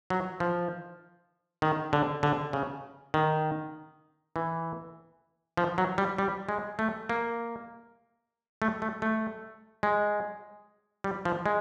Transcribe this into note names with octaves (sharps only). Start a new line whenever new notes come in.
F#3
F3
D#3
D3
D3
C#3
D#3
E3
F3
F#3
G3
G3
G#3
A3
A#3
A3
A3
A3
G#3
G3
F3
G#3